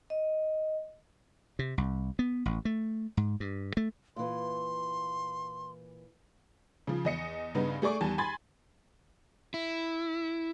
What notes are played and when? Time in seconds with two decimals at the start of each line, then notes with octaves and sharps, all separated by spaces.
0.10 D#5
1.59 C3
1.78 C2
2.19 B3
2.46 A1
2.65 A3
3.17 G#2
3.40 G2
3.77 A3
4.16 A#2 E3 C6
6.87 C#3 F3
7.05 E2 D#5 C#7
7.55 G2 C#3 B3 D#4
7.82 A3 G#4 D5 C#6 D6
8.01 E2 D#3 G3 G#5 A5
8.18 G#5 B5 C6 G#6 A6
9.54 E4